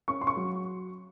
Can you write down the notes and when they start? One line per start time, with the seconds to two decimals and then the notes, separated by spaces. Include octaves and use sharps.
0.08 C#4 C#6
0.21 C6
0.27 C#6
0.37 F#3